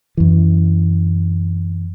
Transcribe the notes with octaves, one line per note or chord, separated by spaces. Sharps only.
F#2 E3